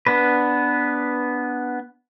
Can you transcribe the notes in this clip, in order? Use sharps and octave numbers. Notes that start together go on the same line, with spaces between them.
B3 D4 B4